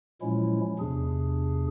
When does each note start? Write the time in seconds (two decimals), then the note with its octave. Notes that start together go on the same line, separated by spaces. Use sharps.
0.22 A#2 F3 F#3 G#3 C#4 E4
0.79 E2 C3 D4 G#4